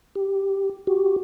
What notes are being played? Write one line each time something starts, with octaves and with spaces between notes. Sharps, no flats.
G4
F#4 G4